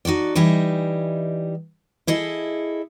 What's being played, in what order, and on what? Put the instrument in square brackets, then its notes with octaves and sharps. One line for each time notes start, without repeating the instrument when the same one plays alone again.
[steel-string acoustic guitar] D#4 F#4 A4 D5
E3 G3 D#4 D#5 E5 G#5
E4 G#4 A4 D#5